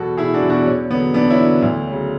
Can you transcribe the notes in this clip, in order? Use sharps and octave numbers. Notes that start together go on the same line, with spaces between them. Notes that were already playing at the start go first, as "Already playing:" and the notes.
Already playing: E2 B2 F#4 A4
E1 E4 G#4
D4 F#4
E2
B2 D4 F#4
E2 C#4
D3 F#3 B3
E2 B3 D4
C#4 E4
D3 F#3
D2
C#3 F#3